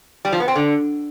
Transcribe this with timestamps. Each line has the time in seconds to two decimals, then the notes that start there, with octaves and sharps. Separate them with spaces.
0.25 G3
0.32 F3
0.40 B3
0.48 C4
0.55 D3